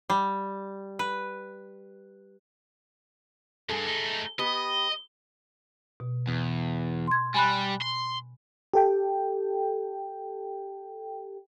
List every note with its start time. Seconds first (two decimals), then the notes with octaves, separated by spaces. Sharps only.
0.10 G3
0.99 B4
3.69 E2 G2 G#4 A4
3.87 A3 D#4
4.39 B3 G4 B4 D#5
6.00 B2
6.28 E2
7.07 C6 G#6
7.34 G3 G#5 B5 F#6
7.82 C6
8.74 G4 A4 G5